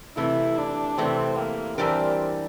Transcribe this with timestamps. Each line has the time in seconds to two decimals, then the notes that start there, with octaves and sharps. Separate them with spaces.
0.17 C3 E3 A3 E4
0.58 D4
0.98 C3 E3 A3 C4
1.38 A#3
1.78 E3 G3 C4 D4 G4 A#4